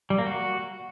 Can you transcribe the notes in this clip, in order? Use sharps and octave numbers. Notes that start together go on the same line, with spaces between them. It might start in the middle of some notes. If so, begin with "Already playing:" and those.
G3
A#3
F#4